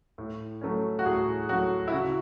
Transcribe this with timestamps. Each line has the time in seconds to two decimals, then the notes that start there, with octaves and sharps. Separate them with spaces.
0.18 A2
0.61 F#3 A3 C#4
0.99 F#4
1.05 A2 G#4
1.49 F#3 A3 C#4 F#4
1.88 E4
1.92 C#3 F#4